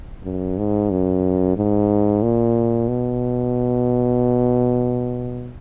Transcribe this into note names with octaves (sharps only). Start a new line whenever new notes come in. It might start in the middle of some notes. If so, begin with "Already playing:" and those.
F#2
G#2
F#2
G#2
A#2
B2